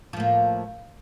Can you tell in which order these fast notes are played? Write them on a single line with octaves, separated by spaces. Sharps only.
F3 A2 A#3